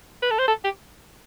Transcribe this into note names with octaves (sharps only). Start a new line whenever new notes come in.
B4
A4
C5
A4
G4